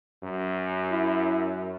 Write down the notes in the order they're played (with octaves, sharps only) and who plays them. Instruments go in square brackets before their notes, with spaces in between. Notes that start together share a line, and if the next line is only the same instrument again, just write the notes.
[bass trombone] F#2
[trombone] E4